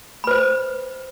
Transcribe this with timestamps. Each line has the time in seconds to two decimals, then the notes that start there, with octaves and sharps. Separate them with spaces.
0.24 B5
0.27 B4
0.31 C5